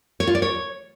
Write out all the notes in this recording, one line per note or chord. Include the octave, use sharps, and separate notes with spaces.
C#5
F4
D5
C#5